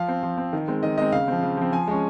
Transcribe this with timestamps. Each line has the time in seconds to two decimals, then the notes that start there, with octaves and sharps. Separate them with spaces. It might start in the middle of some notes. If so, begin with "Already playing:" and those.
Already playing: F3 F5
0.08 C4
0.23 F3
0.38 C4
0.53 D#3
0.68 G#3 C4
0.83 D#3 D#5
0.98 G#3 C4 D#5
1.12 C#3 F5
1.28 F3 C4
1.43 C#3
1.57 F3 C4
1.72 F3 G#5
1.88 G#3 C#4